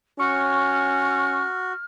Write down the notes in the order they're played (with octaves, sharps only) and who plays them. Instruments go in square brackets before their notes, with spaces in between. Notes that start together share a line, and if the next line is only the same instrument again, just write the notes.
[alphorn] C#4 [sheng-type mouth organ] F#4 [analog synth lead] C#6 [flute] F6